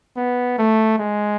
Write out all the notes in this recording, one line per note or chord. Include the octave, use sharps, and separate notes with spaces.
B3
A3
G#3